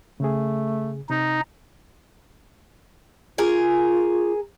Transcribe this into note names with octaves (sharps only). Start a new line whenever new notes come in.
C#3 A3 G#4
C3 D#4
F4 G#4 A#4